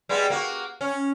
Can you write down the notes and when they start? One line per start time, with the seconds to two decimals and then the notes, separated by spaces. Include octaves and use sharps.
0.09 G3 G#3 B3
0.30 A#3 F#4
0.81 C#4